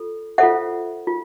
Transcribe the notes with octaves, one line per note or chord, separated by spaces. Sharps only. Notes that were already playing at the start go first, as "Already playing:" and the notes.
Already playing: F4 A4
F4 A4 C5 E5 F#5
F4